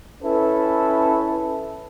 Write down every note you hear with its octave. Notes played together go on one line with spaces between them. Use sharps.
C#4 E4 A4 B4